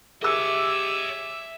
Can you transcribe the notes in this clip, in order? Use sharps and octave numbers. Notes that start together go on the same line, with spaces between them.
G4 G#4 C#5 D#5 E5 E6